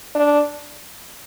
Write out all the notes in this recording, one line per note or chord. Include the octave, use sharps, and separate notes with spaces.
D4